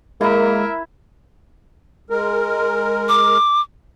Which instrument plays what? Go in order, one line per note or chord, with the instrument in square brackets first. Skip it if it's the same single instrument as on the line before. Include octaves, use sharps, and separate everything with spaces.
[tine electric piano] G#3 [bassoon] A#3 [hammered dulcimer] E4 B5 [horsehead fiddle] A#4 E5
[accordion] G#3 A#4
[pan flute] D6